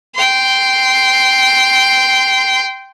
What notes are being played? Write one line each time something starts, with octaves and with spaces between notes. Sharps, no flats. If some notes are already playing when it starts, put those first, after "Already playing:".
G5 C6